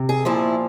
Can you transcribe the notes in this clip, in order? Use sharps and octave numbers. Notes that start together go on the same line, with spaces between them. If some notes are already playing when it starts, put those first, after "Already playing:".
Already playing: C3
G#4
A#2 F3 E4